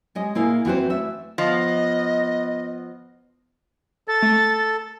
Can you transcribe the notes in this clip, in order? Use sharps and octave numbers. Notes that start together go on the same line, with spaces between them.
G3 G#3 D#5
A#2 A#3 E4 G#4 A#4
E3 C4 F#4 B4 C5
A3 E5
F3 B3 D#5
A4 A6
A3